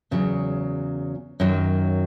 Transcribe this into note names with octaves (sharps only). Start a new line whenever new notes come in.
E2 C#3 F#3
F#2 D#3 F#3